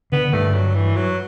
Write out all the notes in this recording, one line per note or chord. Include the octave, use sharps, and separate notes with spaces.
D3 B3
G2 A3
F#3
E3
F#3